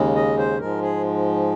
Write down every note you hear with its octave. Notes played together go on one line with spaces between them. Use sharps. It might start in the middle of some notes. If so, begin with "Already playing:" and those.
Already playing: D#2 C#3 G#3
D#5
C5
G#2 F3 G#3 A#4
G#4